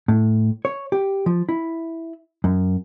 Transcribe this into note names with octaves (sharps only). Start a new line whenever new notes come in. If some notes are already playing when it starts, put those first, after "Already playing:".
A2
C#5
G4
F3
E4
F#2